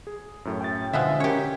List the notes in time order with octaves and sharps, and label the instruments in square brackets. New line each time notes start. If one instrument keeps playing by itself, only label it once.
[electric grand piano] G#4
F#2 A2
[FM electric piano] G5 A6
[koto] B2 F3 G#3 [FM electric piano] D3 [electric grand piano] E5
[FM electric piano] C#4 A#4 [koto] G4 C#5